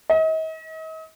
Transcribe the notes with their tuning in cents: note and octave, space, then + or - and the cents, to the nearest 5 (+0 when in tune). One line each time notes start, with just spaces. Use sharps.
D#5 +40